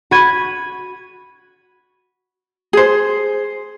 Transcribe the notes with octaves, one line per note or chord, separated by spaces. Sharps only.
F#4 B5 G#6 D#7
G#4 C5